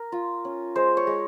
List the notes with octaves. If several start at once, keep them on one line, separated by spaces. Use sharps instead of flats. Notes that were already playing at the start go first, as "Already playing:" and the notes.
Already playing: A#4
F4
C#4
G#3 C5
C#5
G#3